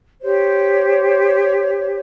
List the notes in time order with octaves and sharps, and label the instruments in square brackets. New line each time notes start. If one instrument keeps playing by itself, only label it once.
[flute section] G4 C5 C#5